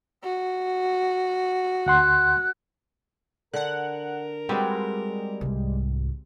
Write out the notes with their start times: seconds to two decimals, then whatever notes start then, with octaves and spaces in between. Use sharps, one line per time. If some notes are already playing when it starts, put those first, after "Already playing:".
0.24 F#4
1.86 D2 F#5 C6 F#6
3.54 D3 A#4 F#5 F#6
4.49 G3 G#3 C4 F#4 B4
5.41 C2 G#2